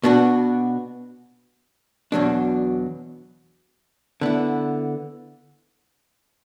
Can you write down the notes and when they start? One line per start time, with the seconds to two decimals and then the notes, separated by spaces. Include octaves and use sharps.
0.04 B2 B3 D4 F#4
2.12 E2 B2 F#3 D4
4.21 D3 B3 E4